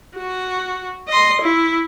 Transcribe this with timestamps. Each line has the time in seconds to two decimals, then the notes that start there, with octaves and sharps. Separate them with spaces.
0.17 F#4
1.08 D#5 C6
1.42 E4